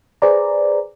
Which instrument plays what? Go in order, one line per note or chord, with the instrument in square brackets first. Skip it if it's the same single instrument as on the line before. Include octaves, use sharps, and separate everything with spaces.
[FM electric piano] G#4 B4 C5 D5 A#5